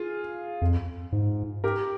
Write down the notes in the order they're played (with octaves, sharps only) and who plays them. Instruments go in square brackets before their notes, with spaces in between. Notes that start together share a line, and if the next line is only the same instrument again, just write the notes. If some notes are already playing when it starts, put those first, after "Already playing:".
Already playing: [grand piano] F4 G#4
[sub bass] F2
G#2
[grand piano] G4 A#4